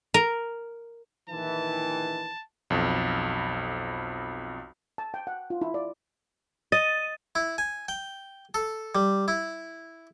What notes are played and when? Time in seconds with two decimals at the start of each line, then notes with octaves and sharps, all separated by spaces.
0.14 A#4
1.30 A#1 D#3 E3 A5
2.70 B1 F2
4.98 A5
5.14 G5
5.27 F#5
5.50 F4
5.62 E4
5.74 D5
6.72 D#5 A6 D#7
7.35 E4
7.58 G#5
7.88 G5
8.54 A4
8.95 G3
9.28 E4